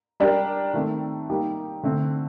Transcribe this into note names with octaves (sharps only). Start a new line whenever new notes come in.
G3 D4 G4 A#4
D#3 A3 C4
G3 A#3 D#4 G4
D3 A3 C4